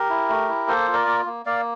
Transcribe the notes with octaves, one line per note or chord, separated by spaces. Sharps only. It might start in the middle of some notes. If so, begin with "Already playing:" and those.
Already playing: G4 A#4
E4
A3
E4
A#3 A4 C5
F4
A#4 D5
A#3
A#3
A#3 D5 F5